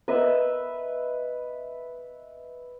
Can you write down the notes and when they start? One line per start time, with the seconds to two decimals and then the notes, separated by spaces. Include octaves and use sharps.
0.08 B4 D#5 E5